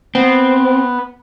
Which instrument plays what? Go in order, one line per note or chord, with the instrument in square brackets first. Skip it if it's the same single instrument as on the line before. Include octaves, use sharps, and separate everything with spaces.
[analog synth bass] B3 [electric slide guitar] C4